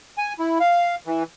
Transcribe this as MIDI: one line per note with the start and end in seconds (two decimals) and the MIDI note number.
0.18 0.33 80
0.39 0.58 64
0.60 0.95 77
1.06 1.23 52